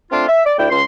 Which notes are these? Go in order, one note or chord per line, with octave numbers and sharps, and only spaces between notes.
A3 C4 D4 F4
E5
D5
D2 D4 E4 G5
C#2 C6